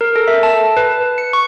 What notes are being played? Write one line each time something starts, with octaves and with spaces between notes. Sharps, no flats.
A#4
A4
E5
A5
B4
C#7
C#6